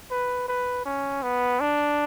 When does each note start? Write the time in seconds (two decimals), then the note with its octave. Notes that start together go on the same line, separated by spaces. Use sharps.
0.11 B4
0.48 B4
0.85 C#4
1.23 B3
1.60 D4